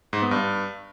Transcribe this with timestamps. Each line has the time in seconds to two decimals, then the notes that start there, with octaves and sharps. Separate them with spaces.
0.13 G#2
0.22 B3
0.31 G2